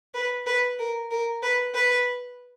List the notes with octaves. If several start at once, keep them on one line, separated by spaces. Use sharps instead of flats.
B4
B4
A#4
A#4
B4
B4